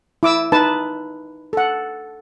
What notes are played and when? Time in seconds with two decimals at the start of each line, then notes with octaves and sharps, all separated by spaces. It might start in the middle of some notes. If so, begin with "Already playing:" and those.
0.23 E4 D6 E6
0.52 D#4 B4 A5
1.53 A4 F#5